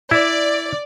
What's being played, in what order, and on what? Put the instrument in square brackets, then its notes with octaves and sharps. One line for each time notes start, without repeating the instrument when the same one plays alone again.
[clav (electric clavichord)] E4 [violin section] D5